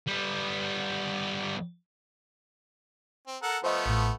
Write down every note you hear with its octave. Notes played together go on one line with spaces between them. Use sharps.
G3 B3
C4
A4 A#4 F#5
F3 A3 B3 C5 D#5
A1 A2